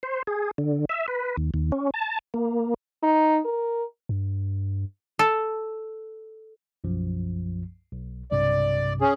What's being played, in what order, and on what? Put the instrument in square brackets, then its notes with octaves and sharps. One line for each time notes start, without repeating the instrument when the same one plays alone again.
[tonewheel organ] C5
G#4
D3
E5
B4
D#2
D#2
C#4
A5
A#3
[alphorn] D#4
A#4
[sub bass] G2
[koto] A4
[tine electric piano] B1 F#2 F3
B1
[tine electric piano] B1 G2 C3 [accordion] D5
[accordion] C#4 G#4